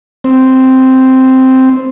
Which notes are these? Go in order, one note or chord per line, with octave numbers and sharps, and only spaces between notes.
C4